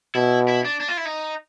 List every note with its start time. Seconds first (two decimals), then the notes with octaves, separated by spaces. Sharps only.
0.15 B2 E4
0.48 E4
0.65 D4
0.80 D4
0.89 F4
0.97 E4
1.05 D#4